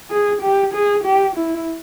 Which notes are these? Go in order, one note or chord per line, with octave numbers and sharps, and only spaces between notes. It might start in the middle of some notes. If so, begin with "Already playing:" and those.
G#4
G4
G#4
G4
E4